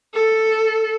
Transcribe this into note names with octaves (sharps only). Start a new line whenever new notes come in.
A4